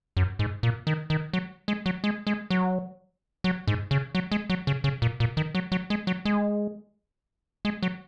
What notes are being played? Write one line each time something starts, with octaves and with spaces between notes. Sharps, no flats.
F#2
G#2
A#2
D#3
D#3
F#3
G#3
F#3
G#3
G#3
F#3
F#3
G#2
C#3
F#3
G#3
F#3
C#3
C#3
A#2
A#2
D#3
F#3
F#3
G#3
F#3
G#3
G#3
F#3